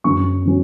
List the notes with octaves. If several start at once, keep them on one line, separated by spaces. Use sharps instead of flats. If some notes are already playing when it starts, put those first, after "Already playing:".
F#2 C#3 F#3 C#4 C#6
C#3 F#3 C#4